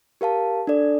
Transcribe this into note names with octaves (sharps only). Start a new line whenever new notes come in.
G4 A#4 F5 A5
D4 A4 D5